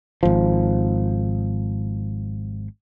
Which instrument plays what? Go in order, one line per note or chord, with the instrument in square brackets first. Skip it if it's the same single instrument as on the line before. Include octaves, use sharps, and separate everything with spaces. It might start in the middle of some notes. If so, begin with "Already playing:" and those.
[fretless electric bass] G#1 F3